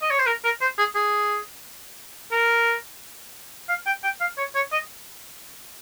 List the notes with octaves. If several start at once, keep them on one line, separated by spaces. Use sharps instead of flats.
D#5
C#5
C5
A#4
A#4
C5
G#4
G#4
A#4
F5
G5
G5
F5
C#5
C#5
D#5